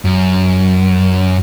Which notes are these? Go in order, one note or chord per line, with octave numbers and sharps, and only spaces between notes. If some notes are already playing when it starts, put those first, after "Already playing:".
F#2